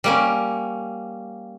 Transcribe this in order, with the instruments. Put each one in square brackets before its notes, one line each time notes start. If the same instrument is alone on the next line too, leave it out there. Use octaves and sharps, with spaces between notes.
[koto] G3 A#3 C#4